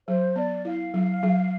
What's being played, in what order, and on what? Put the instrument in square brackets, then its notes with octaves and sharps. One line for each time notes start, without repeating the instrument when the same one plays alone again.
[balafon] F#3 [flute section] C5
[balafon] B3 [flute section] D5
[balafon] E4 [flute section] F5
[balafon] F#3
F#3